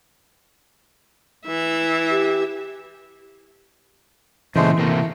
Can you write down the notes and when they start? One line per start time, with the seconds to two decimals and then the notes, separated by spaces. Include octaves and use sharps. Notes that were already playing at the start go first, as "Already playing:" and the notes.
1.47 E3 E5
2.11 G4
4.56 A#2 C#3 E3 G#3 A3 C5
4.78 C3 A3 A#3